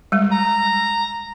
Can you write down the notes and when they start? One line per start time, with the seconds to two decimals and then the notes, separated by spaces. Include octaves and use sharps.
0.12 G3 G#3
0.32 A#5